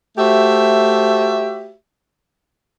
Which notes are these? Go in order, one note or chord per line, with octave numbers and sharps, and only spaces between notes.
A3 F#4 G4 C5 E5